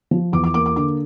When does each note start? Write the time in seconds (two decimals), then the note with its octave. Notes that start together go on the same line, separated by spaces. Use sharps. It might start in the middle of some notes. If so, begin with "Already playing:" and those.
0.11 F3
0.33 E2 D6
0.44 D6
0.54 A#3 D6
0.66 D6
0.76 D3 D6